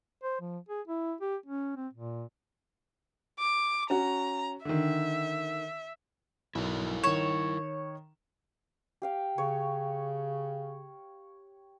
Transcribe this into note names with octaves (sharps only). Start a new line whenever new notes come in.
C5
F3
G#4
E4
G4
C#4
C4
A#2
D6
C#4 F#4 A#5
D3 D#3 E5
B1 E4 A#4 F5
D#3 C#5 E7
G4 F5 G5
C#3 C#5